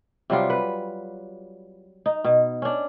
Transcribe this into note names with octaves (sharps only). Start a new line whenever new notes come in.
C3 F#3 G3 F4
B4
D#4
B2
C#4 D4